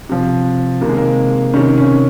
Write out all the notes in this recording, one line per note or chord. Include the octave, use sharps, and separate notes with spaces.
C3 F3
C3 D#3 A#3
G#3
A#3
C3 D#3 C#4
C#4